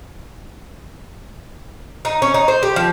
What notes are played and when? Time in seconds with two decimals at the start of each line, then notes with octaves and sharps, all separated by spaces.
2.05 D#4
2.22 C#4
2.34 D#4
2.48 C5
2.63 G4
2.76 F3